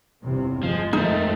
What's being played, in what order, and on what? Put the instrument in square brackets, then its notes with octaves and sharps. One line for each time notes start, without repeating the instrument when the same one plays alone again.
[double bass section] G1 E2 C3
[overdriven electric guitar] F3 [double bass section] G#3
[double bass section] F2 D#3 F3 [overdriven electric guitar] G#3 A3 [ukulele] D#4